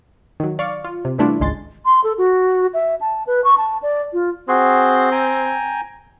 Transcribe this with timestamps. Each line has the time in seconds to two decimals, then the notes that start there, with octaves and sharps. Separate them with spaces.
0.40 D#3 F#3
0.59 D5 F5 C#6
0.85 F4
1.05 C3
1.18 E3 G3 A3 D4 E4 F4
1.40 G#1 C#2 G#3 C6 A6
1.85 C6
2.04 A4
2.18 F#4
2.74 E5
3.01 A5
3.27 B4
3.44 C#6
3.58 A5
3.83 D5
4.13 F4
4.48 C4 F#4 G#4 C6
5.12 G5 G#5 A#5